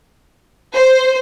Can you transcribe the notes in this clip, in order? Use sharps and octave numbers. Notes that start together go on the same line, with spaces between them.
C5